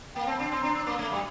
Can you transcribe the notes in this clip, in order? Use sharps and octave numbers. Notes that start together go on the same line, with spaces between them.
A#3 G5
C4 A5
D4
C4 C6
D4 A#5
D4 E6
A#3 D6
A3
G3